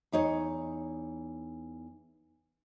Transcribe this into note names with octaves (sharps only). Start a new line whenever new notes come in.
E2 D#4 C#5